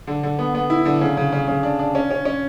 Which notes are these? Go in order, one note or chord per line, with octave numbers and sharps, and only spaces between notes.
D3
D3
B3
B3
E4
D3
C#3
C#3
C#3
C#3
D4
D4
C#4
C#4
C#4